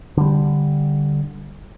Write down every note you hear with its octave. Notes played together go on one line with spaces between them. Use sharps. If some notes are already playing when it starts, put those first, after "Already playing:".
D3 G3